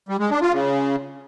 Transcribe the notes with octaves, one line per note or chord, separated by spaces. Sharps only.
G3
G#3
D4
F4
C#3